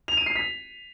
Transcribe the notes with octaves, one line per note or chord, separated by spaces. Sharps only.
F7
D#7
C7
B6